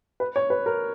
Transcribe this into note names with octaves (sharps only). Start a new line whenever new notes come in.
B4
C#5
B4
A#4